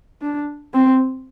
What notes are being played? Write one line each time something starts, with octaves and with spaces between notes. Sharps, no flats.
D4
C4